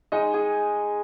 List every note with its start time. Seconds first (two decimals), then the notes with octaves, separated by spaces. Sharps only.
0.12 G#3 D#4 D#5
0.34 G#4